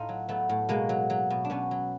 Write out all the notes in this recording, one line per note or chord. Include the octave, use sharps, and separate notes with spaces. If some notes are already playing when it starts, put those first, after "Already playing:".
Already playing: A2 D#4 F4
F#3
F#3 A3 B3
A2
B2 G#3 A#3
F#3
F#3
B2
D4
B2 B3 C#4
F#3